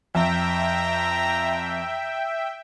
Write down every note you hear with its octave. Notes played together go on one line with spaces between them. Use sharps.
F2 E5 G5 A#5